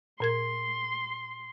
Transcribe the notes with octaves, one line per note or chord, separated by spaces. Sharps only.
A#2 A#4 C6 G#6